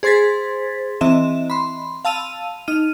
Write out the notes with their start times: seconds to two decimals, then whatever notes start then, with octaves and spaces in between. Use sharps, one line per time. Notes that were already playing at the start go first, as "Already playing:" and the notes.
0.03 G#4 C5 C6 G#6 A6 B6
1.01 E3 C4 D#5 E5 E7
1.50 B5 C6
2.05 F5 A5 E6 D#7 F7
2.68 D#4 F6 D#7